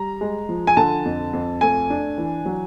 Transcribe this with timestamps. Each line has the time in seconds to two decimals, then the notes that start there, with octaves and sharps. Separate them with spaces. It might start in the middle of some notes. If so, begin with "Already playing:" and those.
Already playing: G3 A#5
0.21 G#3
0.49 F3
0.67 G#5
0.77 D3 A5
1.05 F2
1.33 F2
1.61 A3 G#5
1.90 D4
2.18 E3
2.46 F#3